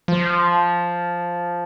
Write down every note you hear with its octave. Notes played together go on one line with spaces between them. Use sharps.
F3